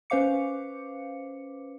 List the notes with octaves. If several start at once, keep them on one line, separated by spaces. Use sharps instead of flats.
C#4 B4 C5 F5 D6 C#7